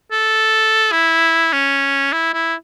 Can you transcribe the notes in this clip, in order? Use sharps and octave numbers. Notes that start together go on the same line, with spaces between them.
A4
E4
C#4
E4
E4